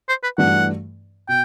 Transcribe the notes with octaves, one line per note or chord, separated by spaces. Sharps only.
C5
B4
G2 E3 A3 D4 F#4 F#5
B2 G5